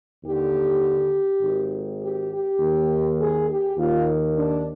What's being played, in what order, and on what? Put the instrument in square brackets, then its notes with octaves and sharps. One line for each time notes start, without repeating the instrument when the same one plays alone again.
[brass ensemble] D#2 D3 G4
G#1 G#2 D#3
G4
G4
D#2 D#3
G#4
G4
D#2 D#3 F4
D4